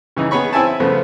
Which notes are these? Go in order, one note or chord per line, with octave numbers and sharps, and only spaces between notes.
C#3 E3 D#4
B3 G#4 C#5 B5 C#6
C4 E4 E5 G#5 A5
E5
C#3 F3 A3 B3